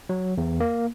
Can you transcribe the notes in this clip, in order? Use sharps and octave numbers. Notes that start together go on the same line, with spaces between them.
F#3
E2
A#3